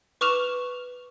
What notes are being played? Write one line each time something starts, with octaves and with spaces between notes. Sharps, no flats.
B4 C#6 D6 F6 E7 F7